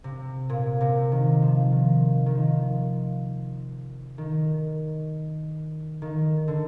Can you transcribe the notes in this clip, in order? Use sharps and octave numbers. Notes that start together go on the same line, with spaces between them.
C3
A#2
C3
D#3
F3
D#3
D#3
F3
D#3
D#3
D3